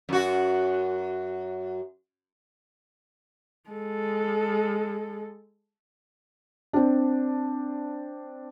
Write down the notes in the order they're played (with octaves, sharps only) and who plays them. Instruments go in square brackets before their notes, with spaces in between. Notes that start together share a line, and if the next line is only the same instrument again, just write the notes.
[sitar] F#2 F#4
[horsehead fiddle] G#3 A4
[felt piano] C4 D4